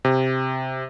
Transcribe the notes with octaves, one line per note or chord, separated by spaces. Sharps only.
C3